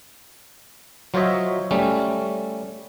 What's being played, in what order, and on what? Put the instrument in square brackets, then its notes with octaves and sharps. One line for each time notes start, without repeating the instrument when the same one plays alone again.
[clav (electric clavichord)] F#3 F4 C5 C#5 D#5 E5
G3 A3 C#4